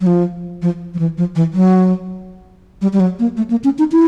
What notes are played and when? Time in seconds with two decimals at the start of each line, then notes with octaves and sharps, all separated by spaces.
0.01 F#3
0.07 F3
0.62 F3
0.94 F3
0.99 E3
1.18 F3
1.36 E3
1.54 F#3
2.82 G3
2.93 G3
3.00 F#3
3.19 A#3
3.37 A3
3.50 A#3
3.64 C#4
3.78 D#4
3.92 E4